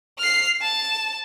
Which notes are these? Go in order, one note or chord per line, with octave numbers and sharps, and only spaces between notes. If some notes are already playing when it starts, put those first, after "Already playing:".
F6 C7
A5